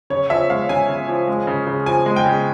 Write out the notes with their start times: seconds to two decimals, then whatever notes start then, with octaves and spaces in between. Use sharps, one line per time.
0.10 C#3 C#5
0.30 F3 E5
0.50 G#3 F5
0.69 C#3 G#5
0.89 C#3
1.08 F3
1.27 G#3
1.47 C#3
1.67 C#3
1.86 F3 G#5
2.06 G#3
2.16 G5
2.26 C#3